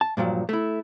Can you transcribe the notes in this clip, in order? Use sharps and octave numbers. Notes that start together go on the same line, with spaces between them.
A5
G2 A#2 F3 F#3
A3 E4